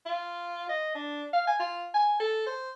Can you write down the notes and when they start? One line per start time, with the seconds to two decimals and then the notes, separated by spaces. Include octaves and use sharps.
0.06 F4
0.69 D#5
0.95 D4
1.33 F5
1.47 G#5
1.59 F4
1.94 G#5
2.20 A4
2.46 C5